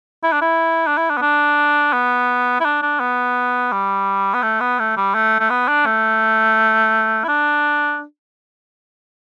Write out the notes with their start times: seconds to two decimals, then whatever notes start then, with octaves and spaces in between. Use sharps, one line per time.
0.23 E4
0.32 D4
0.42 E4
0.87 D4
0.97 E4
1.10 D4
1.17 B3
1.22 D4
1.93 B3
2.60 E4
2.65 D4
2.82 D4
3.00 B3
3.72 G3
4.34 B3
4.43 A3
4.60 B3
4.79 A3
4.97 G3
5.14 A3
5.40 A3
5.50 B3
5.68 D4
5.86 A3
7.24 E4
7.28 D4